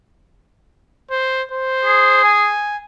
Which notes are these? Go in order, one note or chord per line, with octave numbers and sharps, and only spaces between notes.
C5
C5
G#4
G#5